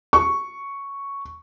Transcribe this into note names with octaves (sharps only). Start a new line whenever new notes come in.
C#6